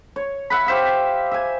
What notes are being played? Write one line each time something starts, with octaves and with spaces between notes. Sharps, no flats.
C#5
E5 F#5 B5
G4 C5 E5 F5
E5 G#5